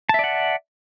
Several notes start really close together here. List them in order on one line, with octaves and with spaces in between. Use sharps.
A5 E5 D5 F#5